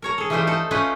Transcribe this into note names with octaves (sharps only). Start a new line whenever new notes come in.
A#4 C#5 A#5
G#4 A4
E3 F3 G3 A3 D#4 C5
D#4 A4
A3 C#4 D#4 F4 B4 D#5